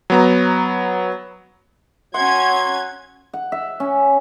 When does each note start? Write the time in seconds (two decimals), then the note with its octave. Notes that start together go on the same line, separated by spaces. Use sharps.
0.10 F#3 B3 A#5
2.14 F#3 C#4 F#5 C6 G#6
3.33 F#5
3.52 E5
3.80 C#4